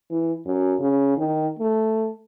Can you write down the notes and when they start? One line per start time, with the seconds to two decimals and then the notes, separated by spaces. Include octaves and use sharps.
0.11 E3
0.46 F#2
0.79 C#3
1.17 D#3
1.59 A3